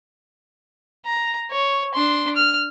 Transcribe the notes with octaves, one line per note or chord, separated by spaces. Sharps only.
A#5
C#5
D4 C6
F6